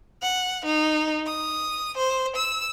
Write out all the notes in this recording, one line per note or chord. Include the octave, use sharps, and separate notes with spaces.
F#5
D#4
D#6
C5
E6